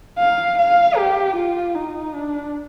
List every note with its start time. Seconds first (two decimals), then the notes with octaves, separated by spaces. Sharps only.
0.18 F5
0.58 F5
0.97 G4
1.36 F4
1.75 D#4
2.14 D4